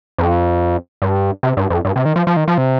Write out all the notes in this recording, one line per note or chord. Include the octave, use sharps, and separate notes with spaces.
F2
G2
C3
G2
F2
G2
C3
D#3
F3
F3
D#3
F3
C3